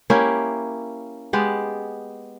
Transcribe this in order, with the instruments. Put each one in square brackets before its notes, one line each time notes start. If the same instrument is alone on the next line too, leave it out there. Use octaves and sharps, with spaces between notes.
[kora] A#3 C#4 E4 G4
G#3 B3 G4